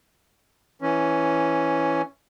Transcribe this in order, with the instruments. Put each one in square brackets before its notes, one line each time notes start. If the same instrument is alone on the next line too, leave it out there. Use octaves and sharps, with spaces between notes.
[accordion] E3 C#4